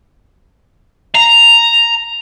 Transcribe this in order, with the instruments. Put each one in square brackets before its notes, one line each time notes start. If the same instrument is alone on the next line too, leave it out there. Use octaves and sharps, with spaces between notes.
[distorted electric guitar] A#5